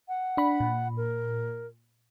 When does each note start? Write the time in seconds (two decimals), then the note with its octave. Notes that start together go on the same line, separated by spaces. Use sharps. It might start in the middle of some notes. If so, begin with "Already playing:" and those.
0.08 F#5
0.37 D4 B5
0.60 A#2
0.97 A#4